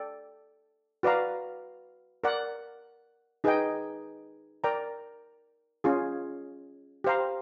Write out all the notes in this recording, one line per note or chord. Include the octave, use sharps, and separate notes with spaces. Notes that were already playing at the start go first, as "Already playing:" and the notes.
Already playing: A4 D5 G5
F#4 B4 D5 F5 A#5
A#4 D5 F#5
D#4 G#4 B4 D#5 G5
A#4 D5 G5 A#5
C#4 F4 G#4
G4 C5 F5 A#5